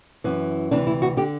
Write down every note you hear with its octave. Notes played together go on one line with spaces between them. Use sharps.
F#2 E3
D2 C3 E3 D4
E4
F#4
D3 G4